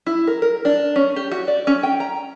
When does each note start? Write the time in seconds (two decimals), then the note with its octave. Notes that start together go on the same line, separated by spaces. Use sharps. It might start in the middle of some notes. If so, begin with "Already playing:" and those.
0.07 E4
0.27 A#4
0.42 A#4
0.65 D4
0.96 C#4
1.16 G4
1.32 F#4
1.48 D5
1.67 C#4
1.83 G5
2.00 A#5